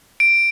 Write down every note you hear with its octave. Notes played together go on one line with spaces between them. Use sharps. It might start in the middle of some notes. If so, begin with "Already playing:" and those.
D7